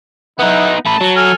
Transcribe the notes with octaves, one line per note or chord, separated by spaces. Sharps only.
B3 D#4 E4 F#5
A3 B4 A5
F#3
A4 G#5 F6